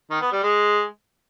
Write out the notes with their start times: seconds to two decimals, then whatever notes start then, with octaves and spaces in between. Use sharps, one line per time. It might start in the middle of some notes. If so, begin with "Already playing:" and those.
0.10 D#3
0.21 B3
0.32 G3
0.43 G#3